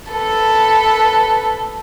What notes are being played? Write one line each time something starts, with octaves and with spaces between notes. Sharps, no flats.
A4 B4